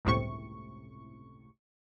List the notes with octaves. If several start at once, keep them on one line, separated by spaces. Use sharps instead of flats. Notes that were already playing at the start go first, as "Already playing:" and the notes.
G1 C#2 A2 C3 C#6